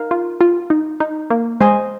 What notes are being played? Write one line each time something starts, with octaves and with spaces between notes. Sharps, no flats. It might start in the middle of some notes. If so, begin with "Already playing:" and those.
Already playing: D#4 A#4 F5
F4
F4
D#4
D#4
A#3
G#3 C5 D#5 G#5 C6